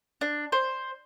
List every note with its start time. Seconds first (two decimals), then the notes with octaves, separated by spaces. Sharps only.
0.21 D4
0.52 C5